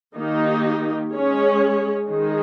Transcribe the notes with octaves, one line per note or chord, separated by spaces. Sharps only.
D#3 A#3 D#4 G4
G#3 C#4 G#4 C#5
D#3 G#3 D#4 G#4